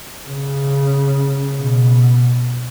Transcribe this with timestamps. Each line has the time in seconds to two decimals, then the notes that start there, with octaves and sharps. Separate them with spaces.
0.28 C#3
1.58 B2